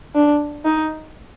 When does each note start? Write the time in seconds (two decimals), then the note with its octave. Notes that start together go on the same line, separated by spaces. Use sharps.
0.15 D4
0.65 D#4